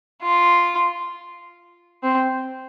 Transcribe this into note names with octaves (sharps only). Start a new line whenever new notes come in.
F4
C4